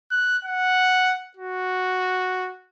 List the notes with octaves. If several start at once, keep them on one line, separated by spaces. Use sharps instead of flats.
F#6
F#5
F#4